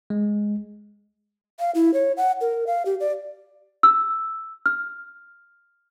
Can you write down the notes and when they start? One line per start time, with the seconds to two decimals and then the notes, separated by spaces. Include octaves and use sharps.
0.10 G#3
1.59 F5
1.75 E4
1.94 C#5
2.17 F#5
2.41 A#4
2.67 F5
2.86 G4
3.00 D5
3.83 E6
4.66 F6